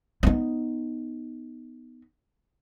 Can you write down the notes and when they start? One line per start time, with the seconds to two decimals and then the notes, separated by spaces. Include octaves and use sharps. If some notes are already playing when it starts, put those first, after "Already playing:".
0.23 B3 D#4